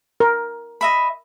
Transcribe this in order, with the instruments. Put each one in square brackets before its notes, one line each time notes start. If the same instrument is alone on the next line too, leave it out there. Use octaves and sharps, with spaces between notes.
[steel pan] A#4
[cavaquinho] D#5 E5 B5